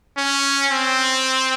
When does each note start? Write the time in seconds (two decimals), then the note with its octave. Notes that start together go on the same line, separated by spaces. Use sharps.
0.17 C#4
0.71 C4